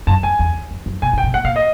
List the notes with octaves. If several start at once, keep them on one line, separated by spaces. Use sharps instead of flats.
F#2 A5
F2 G#5
E2
F2
F#2
B2 G#5
B2
G5
C3
A#2 F#5
A#2 F5
D#5